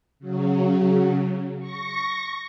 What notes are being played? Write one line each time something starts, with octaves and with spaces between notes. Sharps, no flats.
C#3 F#3
C#6 A#6